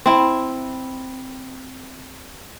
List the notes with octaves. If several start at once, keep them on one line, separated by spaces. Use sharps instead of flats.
C4 E4